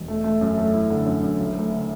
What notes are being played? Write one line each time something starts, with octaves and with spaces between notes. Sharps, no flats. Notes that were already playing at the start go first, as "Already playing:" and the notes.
Already playing: E1
A3
A3
F#2
A3
E4
D3
F#2
F#2
F#1
A3
D3